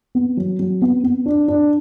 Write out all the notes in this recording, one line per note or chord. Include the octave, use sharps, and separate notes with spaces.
B3
F#3
F#3
B3
B3
D4
D4